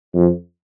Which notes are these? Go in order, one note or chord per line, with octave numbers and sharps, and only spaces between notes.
F2